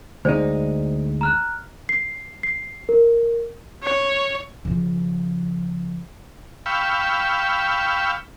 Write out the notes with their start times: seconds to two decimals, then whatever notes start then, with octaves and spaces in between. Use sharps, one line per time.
0.25 D2 G#3 D#4 C5 D5
1.21 A#5 F6 F#6
1.89 C7
2.43 C7
2.89 A#4
3.83 C#5
4.65 C#3 F3
6.66 F5 G5 B5 C#6 E6